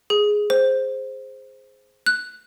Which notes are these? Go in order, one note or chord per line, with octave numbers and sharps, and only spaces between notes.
G#4
C5
F#6